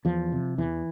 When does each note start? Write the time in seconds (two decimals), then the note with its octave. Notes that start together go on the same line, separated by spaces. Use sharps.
0.05 E2 F3
0.32 C3
0.58 E2 E3